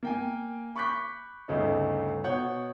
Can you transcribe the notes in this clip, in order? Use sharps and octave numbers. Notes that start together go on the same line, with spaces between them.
A#3 G5 G#5
B5 C#6 D6 F#6 G6 B6
G1 D2 C#3 A3 D#4
B2 C#5 F#5 G6